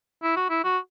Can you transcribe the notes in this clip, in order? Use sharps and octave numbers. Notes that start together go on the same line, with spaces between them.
E4
F#4
E4
F#4